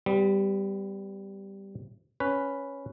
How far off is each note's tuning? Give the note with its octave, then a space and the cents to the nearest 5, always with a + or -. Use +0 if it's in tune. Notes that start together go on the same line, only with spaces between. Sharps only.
G3 +0 B3 +35
C#4 +0 B4 +0